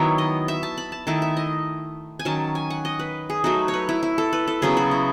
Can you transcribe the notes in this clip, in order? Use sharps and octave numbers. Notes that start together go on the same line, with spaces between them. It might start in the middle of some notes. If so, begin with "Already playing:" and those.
Already playing: D#3 F#3 B3 E4 C#5
D#5
E5
A5
B5
A5
D#3 A3 E4 A5
E5
D#5
G#5
D#3 F#3 C#4 A5
G#5
F#5
D#5
B4
G#4
F#3 A3 D#4 F#4
C#5
B4
E4
E4
A4
B4
A4
C#3 F#3 B3 G#4
F#4
E4